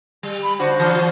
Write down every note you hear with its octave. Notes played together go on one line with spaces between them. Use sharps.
G3
B5
D3 D4 F#4 C5
E3 F3